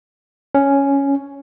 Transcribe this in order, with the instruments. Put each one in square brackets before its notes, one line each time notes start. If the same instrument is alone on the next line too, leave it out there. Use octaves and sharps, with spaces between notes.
[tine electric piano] C#4